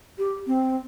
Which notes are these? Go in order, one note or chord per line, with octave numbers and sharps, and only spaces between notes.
G4
C4